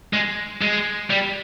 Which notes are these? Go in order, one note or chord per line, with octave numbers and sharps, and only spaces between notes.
G#3
G#3
G3